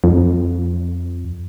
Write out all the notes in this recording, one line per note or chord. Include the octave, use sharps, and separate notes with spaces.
F2